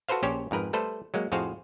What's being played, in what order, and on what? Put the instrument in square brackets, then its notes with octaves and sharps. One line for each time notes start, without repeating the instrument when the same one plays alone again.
[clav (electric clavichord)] F#4 A4 B4 C5 F5
A#1 C#4 G4 C5 C#5
F2 G#2 A#4 B4
G3 A3 A4 B4 C5
F#3 G#3 A#3
F2 A2 F#4 G#4 C5 F5